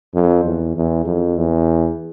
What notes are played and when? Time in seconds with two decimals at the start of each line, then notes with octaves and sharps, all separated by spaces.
0.14 F2
0.44 E2
0.76 E2
1.06 F2
1.37 E2